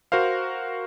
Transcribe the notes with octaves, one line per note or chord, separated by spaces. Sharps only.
F#4 A#4 C5 F5